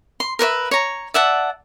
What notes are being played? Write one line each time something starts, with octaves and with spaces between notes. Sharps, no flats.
C6
A#4 B4 C#5 E5
C#5 A#5
D5 E5 F#5 A5